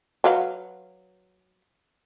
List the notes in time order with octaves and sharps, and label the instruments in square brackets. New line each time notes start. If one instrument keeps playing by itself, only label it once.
[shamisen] F#3 B4 F5